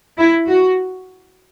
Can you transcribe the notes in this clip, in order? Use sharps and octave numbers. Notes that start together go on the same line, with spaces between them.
E4
F#4